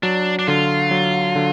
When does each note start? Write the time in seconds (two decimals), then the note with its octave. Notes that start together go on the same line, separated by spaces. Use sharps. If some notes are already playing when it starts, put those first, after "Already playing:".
0.03 F#3 D4
0.39 D4
0.47 D3 F4
0.91 F#3
1.36 D3